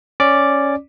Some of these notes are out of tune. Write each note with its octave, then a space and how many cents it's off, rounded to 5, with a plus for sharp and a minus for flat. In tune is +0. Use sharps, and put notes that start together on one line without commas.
C#4 +0 D5 +0 D6 +0